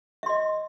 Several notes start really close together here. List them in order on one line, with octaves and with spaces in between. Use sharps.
E5 C6 D#5